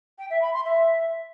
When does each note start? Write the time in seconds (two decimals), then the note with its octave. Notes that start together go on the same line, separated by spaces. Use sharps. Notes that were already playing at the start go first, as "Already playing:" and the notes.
0.18 G5
0.30 E5
0.41 B5
0.53 C6
0.65 E5